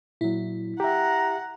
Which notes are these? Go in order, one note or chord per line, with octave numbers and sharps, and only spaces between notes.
A#2 F#3 E4
G4 E5 F#5 A#5